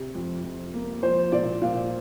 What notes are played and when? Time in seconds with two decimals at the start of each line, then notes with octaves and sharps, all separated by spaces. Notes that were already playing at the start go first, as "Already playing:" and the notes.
Already playing: C3
0.14 F2
0.43 F2
0.74 A#3
1.03 F3 C5
1.32 A#2 D5
1.62 A#2 F5